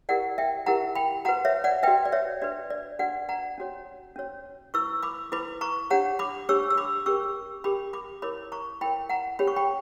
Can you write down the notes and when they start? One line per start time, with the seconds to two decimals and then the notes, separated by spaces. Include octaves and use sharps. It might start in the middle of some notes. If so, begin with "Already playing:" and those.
0.09 E4 G4 A#4 D5 F#5
0.38 E5 G5
0.66 E4 G4 A#4 F#5 A#5
0.95 G5 B5
1.25 F#4 B4 F#5 A#5
1.45 C#5 E5
1.64 D5 F#5
1.83 F#4 B4 E5 G5
2.06 D5
2.12 C#5 E5
2.42 D4 F#4 B4 D5
2.70 D5
2.99 D4 F#4 B4 D5 F#5
3.29 F#5 A#5
3.58 C#4 F#4 C#5
4.16 C#4 F#4 C#5
4.74 E4 B4 C#6 E6
5.02 B5 D6
5.32 E4 B4 B5 D6
5.61 A#5 C#6
5.90 D4 G4 C#5 F#5 A#5
6.19 B5 D6
6.49 D4 G4 C#5 C#6 E6
6.70 E6
6.77 B5 D6
7.06 C#4 G4 A#4 C#6 E6
7.64 C#4 G4 A#4 B5 D6
7.93 B5 D6
8.22 E4 A#4 C#5 B5 D6
8.52 A#5 C#6
8.81 E4 A#4 C#5 G5 B5
9.09 F#5 A#5
9.39 C#4 G4 C#5 B5
9.47 C#6
9.56 G5 B5